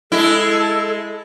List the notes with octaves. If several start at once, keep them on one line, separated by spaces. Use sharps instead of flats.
G#3 E4 A4